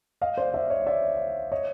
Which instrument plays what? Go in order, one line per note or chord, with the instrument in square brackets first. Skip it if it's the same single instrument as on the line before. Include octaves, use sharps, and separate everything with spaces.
[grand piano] D#5 F5
C5 D5
D5 E5
C#5 D#5
D5 E5
C#5 D#5